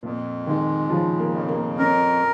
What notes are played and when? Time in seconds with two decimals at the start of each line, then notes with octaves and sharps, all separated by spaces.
0.03 F2 A#2
0.47 D#3 G#3
0.90 C#3 F3
1.19 A#3
1.34 F2
1.49 A#3
1.78 C#4 A#4